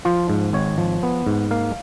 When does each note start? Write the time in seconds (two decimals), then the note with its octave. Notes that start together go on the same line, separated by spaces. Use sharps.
0.05 F3 F4
0.30 G#2
0.53 G#1 C#5
0.78 F3
1.03 B3
1.26 G#2
1.51 A#3 F5